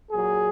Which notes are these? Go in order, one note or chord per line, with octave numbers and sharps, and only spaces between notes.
A#2 F#3 G#4